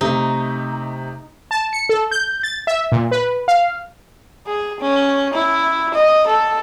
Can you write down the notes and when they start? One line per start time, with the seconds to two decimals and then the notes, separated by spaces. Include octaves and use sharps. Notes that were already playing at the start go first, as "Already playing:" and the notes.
0.01 C3 A3 D#4
1.51 A5
1.73 C#7
1.89 A4
2.11 G6
2.43 A6
2.67 E5
2.92 A#2
3.11 B4
3.48 F5
4.47 G#4
4.80 C#4
5.34 E4
5.94 D#5
6.27 A4